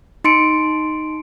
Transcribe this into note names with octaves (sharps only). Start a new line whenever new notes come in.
D#4 C6 C#7 D7